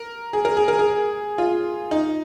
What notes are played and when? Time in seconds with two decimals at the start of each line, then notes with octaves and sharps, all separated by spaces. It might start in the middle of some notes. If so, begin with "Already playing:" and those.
Already playing: A#4
0.33 G#4
0.45 A#4
0.57 G#4
0.68 A#4
0.79 G#4
1.38 F4
1.91 D#4